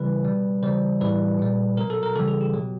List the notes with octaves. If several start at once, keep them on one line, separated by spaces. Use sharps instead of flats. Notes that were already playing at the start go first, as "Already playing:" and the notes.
Already playing: C#3 E3 G3 B4
B2 G3
C#3 E3 G3 C5
A2 E3 G3 B4
A#2 G3
B2 F#3 A#4
A4
A#4
C#3 E3 G3 A4
G#4
G4
B2 F#3